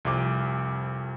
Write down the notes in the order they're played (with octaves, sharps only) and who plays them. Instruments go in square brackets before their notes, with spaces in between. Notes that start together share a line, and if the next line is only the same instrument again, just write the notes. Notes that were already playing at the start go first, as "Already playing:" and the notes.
[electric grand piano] C2 F2 D6